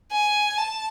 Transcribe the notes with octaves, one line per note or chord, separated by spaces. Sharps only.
G#5
A5